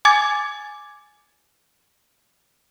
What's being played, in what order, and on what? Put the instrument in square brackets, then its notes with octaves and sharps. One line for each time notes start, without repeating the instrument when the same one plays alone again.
[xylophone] G#5 D6 G#6 A6